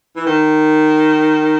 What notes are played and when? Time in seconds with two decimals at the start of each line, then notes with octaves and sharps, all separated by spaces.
0.15 E3
0.24 D#3